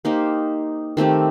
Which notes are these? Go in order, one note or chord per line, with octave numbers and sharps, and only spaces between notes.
A#3 D#4 G4 C5
D#3 A3 C4 G4